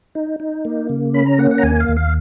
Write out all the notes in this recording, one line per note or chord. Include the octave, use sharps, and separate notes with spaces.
D#4
D#4
A#3
C#3
C#4 B5
A#5
A#3 F#5
F#5
A#5
D#2 G#5
F5
D#2
F5